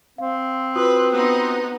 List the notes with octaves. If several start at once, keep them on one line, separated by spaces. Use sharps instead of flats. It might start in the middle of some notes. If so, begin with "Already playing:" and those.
C4 F5
F4 F#4 B4 D#6
B3 D#4